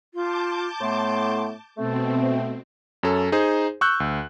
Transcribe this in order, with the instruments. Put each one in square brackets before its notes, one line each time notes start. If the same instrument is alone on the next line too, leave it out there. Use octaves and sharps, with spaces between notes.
[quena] F4 [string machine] A5 D6 G6
[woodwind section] A2 A3 B3 [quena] C6
[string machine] B2 C4 [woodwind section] A3 [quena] A4
[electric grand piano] F#2 C#4 A4
D#4 G#4 C5
C#6 E6 F#6 G6
D2